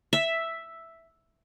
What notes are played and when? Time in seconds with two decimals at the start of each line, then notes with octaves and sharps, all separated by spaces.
0.13 E5